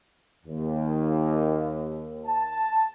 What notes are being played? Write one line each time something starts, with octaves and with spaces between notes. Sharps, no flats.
D#2
A5